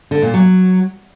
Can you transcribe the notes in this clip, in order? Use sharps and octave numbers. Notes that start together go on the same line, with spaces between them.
D3
A#2
F#3